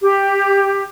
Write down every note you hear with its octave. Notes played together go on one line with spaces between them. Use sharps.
G4